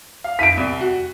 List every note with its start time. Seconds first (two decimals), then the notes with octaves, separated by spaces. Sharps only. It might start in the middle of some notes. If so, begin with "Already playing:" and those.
0.24 F5
0.39 E5 B6 D7 D#7
0.57 C2
0.80 F#4